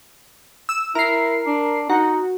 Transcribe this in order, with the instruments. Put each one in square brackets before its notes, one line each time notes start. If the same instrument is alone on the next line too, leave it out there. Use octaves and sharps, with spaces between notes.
[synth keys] E6
[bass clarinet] E4 [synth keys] A#4 C7
[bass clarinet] D4
[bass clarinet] D#4 [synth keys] F#4